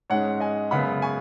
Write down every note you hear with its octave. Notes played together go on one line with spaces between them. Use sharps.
G#2 G#3 C#4 C#5 F#5
D#5 G#5
F#2 C#3 G#3 B3 F#5 B5
G#5 C#6